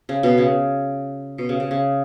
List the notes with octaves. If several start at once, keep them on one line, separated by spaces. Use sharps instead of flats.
C#3
B2
C#3
B2
C#3
C#3
C#3